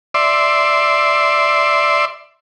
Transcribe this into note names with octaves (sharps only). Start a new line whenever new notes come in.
D5 E5 C6